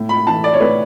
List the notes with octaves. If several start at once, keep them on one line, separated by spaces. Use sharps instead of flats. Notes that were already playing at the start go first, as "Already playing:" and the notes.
Already playing: A2
B5
E3 A5
D5
C#5
A2 B4